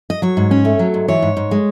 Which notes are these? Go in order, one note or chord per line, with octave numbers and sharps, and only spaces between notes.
D#5
F#3 C#5
G#2
C#4
A3
F#3
G#2
E3 C#5
G#2
G#2
G#3